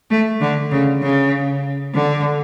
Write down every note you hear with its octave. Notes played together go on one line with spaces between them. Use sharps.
A3
D3
C#3
C#3
D3